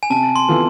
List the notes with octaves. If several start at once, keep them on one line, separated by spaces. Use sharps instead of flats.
G#5
C3 A5
C6
E3 B3 F4 A4